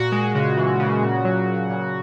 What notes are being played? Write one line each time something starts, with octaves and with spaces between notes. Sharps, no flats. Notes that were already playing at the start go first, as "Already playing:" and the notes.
Already playing: A#2 F#4
G#3
C#3
E3
C#3
A#2
F#3
F#3
A#2